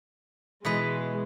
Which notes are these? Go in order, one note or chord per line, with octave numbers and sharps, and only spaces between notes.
B2 E3 G#3 B4